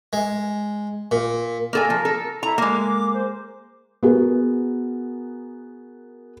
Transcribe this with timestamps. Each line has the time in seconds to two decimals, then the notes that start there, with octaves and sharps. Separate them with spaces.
0.13 G#3
1.11 A#2
1.73 A#3 A4 A#4 G#5
1.90 F3
2.05 A4
2.43 E4 A#5
2.58 G#3 A#3 D6
3.13 C5
4.03 B3 F#4 G#4 A#4